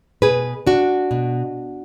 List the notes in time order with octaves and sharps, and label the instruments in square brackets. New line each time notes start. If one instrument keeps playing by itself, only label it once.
[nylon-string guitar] B2 G#4 B4
D4 F#4
B2